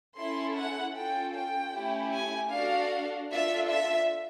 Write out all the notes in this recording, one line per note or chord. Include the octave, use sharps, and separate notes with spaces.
C#4 E4 A4 C6
F#5
C#4 F4 A4 G5
G5
A3 C#4 E4 G4
G#5
D4 F#4 A4 F5
D4 F4 A4 E5
E5